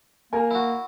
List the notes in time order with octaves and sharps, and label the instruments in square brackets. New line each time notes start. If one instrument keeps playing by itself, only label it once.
[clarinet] A#3 [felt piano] A#4 G#5
[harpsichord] E4 F#4